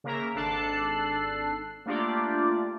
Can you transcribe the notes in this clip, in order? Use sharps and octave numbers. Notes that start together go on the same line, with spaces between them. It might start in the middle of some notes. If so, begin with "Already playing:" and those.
C#3 A#3 A#4 E5 A#5
G#1 D4 A4 A5 F#6 C7
A3 A#3 D4 F4 G4 D5